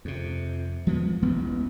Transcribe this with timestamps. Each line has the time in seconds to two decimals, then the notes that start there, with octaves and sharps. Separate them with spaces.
0.05 F2 C3
0.87 F3 G#3 B3
1.22 E1 A1 D#2 B3